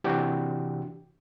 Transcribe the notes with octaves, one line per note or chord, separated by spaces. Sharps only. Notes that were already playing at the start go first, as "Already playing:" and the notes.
C3 E3 D4 F#4 G4